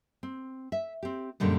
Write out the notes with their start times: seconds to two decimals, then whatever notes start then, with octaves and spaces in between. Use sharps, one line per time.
0.23 C4
0.72 E5
1.03 C4 G4
1.40 F#2 A#2 D3 G3 G#3